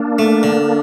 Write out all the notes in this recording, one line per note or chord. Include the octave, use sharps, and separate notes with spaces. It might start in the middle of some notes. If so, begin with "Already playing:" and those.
Already playing: A#3 D4
A3
D3